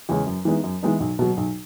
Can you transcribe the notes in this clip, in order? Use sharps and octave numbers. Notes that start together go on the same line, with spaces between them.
E2 C#3 G#3 C#4
F#2
E3 G#3 B3 D#4
F#2
E3 G#3 B3 D#4
B1
B2 F#3
B1